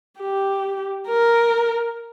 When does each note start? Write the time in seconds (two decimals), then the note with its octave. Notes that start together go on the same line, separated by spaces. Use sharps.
0.19 G4
1.08 A#4